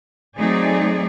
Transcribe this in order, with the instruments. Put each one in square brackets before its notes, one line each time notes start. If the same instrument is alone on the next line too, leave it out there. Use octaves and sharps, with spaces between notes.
[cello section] F#3 A3 C4 D#4 G#4 D5